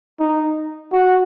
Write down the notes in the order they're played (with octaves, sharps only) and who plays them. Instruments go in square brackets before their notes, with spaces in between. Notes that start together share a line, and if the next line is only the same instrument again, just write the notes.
[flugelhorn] D#4
F#4